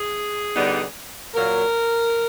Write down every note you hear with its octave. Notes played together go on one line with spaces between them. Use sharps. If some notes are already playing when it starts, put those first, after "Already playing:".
Already playing: G#4
D3 G3 B3 D#4
A#2 F#3 A#3 A#4